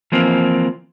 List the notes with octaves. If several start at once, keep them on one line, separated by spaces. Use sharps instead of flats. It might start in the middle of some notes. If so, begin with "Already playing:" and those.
E3 F3 A#3 C4